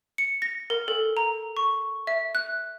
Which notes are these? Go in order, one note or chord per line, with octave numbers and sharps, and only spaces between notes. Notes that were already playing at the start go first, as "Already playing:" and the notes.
C#7
A#6
A#4
A4
A#5
C#6
E5
F#6